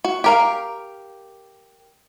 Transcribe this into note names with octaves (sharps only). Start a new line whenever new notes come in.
F#4
G4 A#4 F5